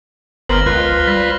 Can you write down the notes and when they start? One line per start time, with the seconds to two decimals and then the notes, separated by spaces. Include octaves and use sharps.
0.49 G1 B3 A#4 C5 F6 A#6 F#7
0.66 C#2 F4 B4 C5 F#6
1.07 G3 B6